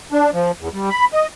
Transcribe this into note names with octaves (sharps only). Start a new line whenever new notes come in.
D4
F3
E2
G3
B5
D#5